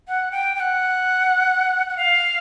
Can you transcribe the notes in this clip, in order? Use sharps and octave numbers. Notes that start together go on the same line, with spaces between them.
F#5
G5
G5
F#5
F#5
F5